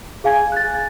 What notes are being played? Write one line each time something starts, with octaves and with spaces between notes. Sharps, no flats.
G#4 F5 G#5 G#6
F#6 A6